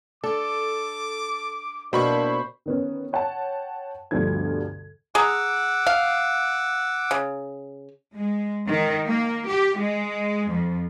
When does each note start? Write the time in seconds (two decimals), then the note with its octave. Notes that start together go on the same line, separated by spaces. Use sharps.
0.24 D4 A4 D6
1.93 B2 A#3 D4 E4 C5 B5 C#6
2.66 D#3 B3 C#4
3.13 C#5 F#5 G5 A5
4.11 D2 G2 B2 D3 F3 G#6
5.15 G#4 F#5 A#5 D6 E6
5.87 F5
7.11 C#3
8.15 G#3
8.67 D#3
9.07 A#3
9.47 G4
9.78 G#3
10.50 F2